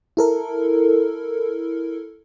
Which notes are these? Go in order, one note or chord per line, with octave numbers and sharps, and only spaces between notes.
E4 A4 A#4